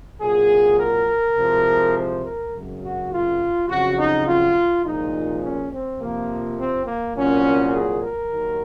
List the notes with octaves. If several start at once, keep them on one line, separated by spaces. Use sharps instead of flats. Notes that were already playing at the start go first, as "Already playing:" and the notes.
C2 A#2 F#3 G#4
A#4
C2 C3 F3 G#3
C5
A#4
G#1 F#2 C#3 F#3
F#4
F4
F2 C#3 F#3 F#4
D#4
F4
C2 A#2 F3 G#3 D#4
C#4
C4
F2 C3 F3 A#3
C4
A#3
C2 A#2 F#3 C#4
G#4
A#4
D#2 D#3 F#3